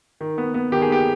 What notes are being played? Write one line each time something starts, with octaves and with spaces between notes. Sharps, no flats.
D#3
B3
B3
D#3 G4
G#4
B3 G4